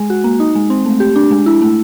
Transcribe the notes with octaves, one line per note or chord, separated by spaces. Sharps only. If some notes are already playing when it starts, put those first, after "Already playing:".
Already playing: G#3
F#4
A#3
D#4
G#3
C4
A3
G4
D4
G#3
E4
A3